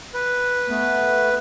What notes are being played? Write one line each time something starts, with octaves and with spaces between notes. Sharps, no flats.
B4
A3 B3